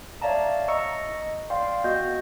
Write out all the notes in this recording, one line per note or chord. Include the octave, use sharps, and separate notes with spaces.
C#5 D5 E5 F5 A5 A#5
D#5 A#5 C#6 E6 C#7
D5 F5 G5 C6
B3 F#4 D#5 G6